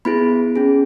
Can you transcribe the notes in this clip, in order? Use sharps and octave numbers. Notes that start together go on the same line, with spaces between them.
B3 E4 G#4 B5
C#4 G#4